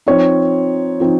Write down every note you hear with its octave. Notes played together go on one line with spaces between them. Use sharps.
F3 C4 D#4 C#5
F3 C4 D#4